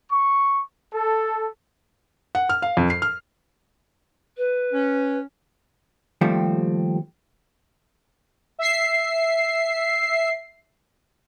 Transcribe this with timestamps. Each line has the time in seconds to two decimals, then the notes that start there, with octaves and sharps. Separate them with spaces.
0.11 C#6
0.93 A4
2.35 F#5
2.49 F6
2.62 F5
2.77 F2
2.90 C7
3.02 F6
4.37 B4
4.73 C#4
6.21 D#2 F3 G3 A3 C4
8.59 E5 C7